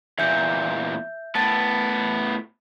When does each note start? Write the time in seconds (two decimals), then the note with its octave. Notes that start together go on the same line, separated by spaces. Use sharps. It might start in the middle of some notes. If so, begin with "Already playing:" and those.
0.18 E2 A#2 E5 G6
1.35 A2 B3 A5 A6